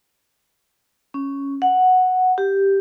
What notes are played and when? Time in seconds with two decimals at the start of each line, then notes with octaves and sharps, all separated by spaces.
1.14 C#4
1.62 F#5
2.38 G4